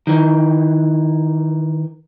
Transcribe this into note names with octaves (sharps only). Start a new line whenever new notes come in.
D#3 E3